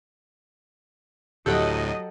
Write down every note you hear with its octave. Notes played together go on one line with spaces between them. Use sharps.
D2 A2 F#3 G4 A4 D#5 F#5 G5